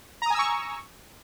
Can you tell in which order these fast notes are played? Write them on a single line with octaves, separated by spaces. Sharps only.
A#5 D#6 G#5 E6 C#6